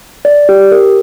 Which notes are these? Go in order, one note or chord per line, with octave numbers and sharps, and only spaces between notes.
D5
G4
A#4